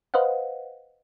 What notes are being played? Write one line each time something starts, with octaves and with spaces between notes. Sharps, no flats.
B4 C5 D#5 F5 F#5